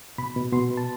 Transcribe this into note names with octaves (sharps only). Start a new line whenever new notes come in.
B2 B5
B2
B2 C6
B3
A5